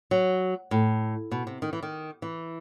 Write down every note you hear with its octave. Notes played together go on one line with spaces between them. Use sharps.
F#3
A2
B2
C3
D#3
E3
D#3
E3